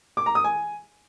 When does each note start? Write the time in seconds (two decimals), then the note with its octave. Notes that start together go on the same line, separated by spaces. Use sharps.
0.17 D6
0.26 A#5
0.35 D#6
0.44 G#5